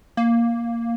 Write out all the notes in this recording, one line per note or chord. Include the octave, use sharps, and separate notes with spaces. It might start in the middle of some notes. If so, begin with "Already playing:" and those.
A#3